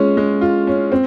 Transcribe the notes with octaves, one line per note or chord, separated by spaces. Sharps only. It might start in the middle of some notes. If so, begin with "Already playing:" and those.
Already playing: G#3 C#4 F4
G#3
F4
C#4
C4